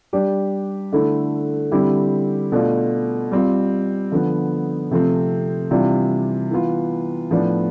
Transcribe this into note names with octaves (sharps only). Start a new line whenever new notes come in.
G3 D4 G4
D3 A3 E4
D3 G3 C4 E4 G4
B2 A3 D4 F4
G3 C4 F4
D3 F3 B3
C3 F3 A3 C4
C3 E3 G3 D4 F4
E3 B3 F4
A2 F3 B3 D4